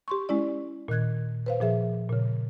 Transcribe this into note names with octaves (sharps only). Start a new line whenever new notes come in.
G4 C6 C#6
G#3 C#4 E4 D5
A#2 D#3 F#6 G#6
B4 C5 F5
A#2 F3 G#4 E5
A#2 C#3